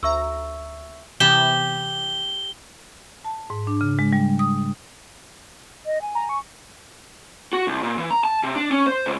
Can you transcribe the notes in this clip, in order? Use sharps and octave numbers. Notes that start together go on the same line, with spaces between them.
D2 E5 A#5 C#6 E6
C3 E3 B3 G4 E7 G7
A5
G#2
D4
C#3
G#3
G3
D#6
D#5
G#5
A#5
C#6
F#4
C2
A#2
E3
A#5
A5
C3
D4
C#4
C5
C#2